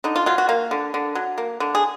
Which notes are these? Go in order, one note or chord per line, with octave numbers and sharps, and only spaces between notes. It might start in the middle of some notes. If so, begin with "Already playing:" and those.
D3 D#4
F4
F#3 F4
F#4
A#3 F5
D3
D3
F#3
A#3
D3
G#4